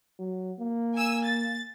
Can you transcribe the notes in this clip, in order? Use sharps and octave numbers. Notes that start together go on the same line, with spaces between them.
F#3
A#3
G#5 E6
A6